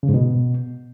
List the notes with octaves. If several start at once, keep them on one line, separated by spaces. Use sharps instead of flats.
C#3
G#2
B2